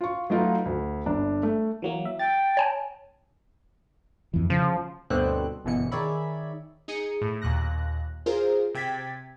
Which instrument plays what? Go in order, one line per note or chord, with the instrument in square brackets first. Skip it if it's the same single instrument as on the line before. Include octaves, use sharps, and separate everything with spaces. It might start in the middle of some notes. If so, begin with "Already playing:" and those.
[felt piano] F4 C#6
F#3 A3 D#4 F4 B4
D2
G1 D4
A3
[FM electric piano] E3 F#3 A#3
E5
[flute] G5 [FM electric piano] A6
[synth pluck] C#5 G#5 A5
[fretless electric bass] F2 E3
[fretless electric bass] C#3 [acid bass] F3
[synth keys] D2 G2 B2 D3 C4 F#6
G1 F#2 B2 E3 C#7
D#3 G#4 C#5 D5 E5 B5
D#4 G#4 C#7 D#7
A2
D#2 A#2 F#6 A#6
F4 G#4 A#4 C5
C3 G5 G#6 A6 B6